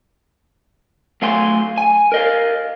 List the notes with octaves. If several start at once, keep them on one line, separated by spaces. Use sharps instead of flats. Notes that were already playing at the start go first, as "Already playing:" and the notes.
F#3 A3 F5 G#5 C6
G#5
A#4 D#5 F5